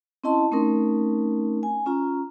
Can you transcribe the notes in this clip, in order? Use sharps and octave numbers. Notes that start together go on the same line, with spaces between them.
C4 C#4 E4 D#5 A5 C6
A3 C4 C#4 D#4 A#4
G#5
C#4 F4 A#5